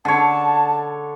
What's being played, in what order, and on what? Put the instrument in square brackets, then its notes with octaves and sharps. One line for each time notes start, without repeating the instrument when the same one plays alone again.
[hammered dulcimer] D3 C#5 [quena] A5